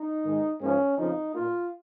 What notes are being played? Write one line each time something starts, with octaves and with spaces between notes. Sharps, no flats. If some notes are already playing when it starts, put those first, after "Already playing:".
Already playing: D#4
G#2 D#3 G#3
G#2 F3 A#3 C#4
F2 C#3 F3 D#4
A#2 A#3 F4